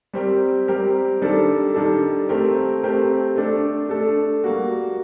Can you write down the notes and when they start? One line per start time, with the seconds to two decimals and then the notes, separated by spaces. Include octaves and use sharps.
0.13 G3 C4 G4 A#4
0.68 G3 C4 G4 A#4
1.22 D#3 G3 D4 A4
1.74 D#3 G3 D4 A4
2.29 A3 C4 G4 A#4
2.83 A3 C4 G4 A#4
3.36 A3 D4 A4
3.89 A3 D4 A4
4.44 G3 A#3 F#4